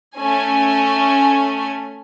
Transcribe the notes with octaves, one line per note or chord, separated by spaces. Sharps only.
A3 C#4 G#5